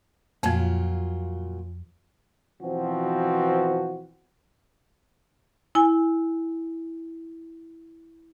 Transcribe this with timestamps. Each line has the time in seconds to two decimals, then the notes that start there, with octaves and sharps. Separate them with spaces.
0.43 F2 A#2 F3 F#3 F4
2.61 B2 E3 F3 C4 F#4
5.75 E4 G#5